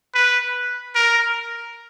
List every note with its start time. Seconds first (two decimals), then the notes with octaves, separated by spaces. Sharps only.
0.14 B4
0.95 A#4